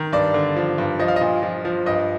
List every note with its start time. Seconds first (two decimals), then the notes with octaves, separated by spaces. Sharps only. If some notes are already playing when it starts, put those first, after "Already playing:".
Already playing: D#3
0.13 G2 D5
0.34 D3
0.56 F3
0.78 G2
0.99 F3 D#5
1.08 F5
1.16 D#5
1.21 A#2
1.43 F3
1.65 F3
1.86 G2 D#5